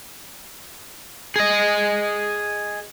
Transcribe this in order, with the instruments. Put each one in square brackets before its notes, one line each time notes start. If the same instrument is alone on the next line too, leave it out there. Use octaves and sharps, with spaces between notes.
[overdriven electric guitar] G#4 D#5